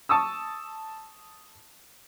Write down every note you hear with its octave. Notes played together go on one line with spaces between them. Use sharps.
A5 C#6 D#6 E6